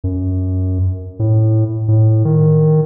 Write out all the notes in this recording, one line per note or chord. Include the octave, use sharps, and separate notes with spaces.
F#2
A2
A2
D#3